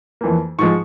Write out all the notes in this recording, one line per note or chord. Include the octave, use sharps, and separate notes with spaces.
F2 E3 A#3
G#2 F3 G#3 C#6